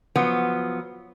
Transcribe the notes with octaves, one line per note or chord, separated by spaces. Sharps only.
F3 F#3 B3